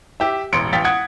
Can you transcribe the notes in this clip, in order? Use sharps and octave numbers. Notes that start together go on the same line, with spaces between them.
G4 E5
E1 A1 C6 C#7 D7
A1 F5 G5 A6 B6
F#5 D#6 G#6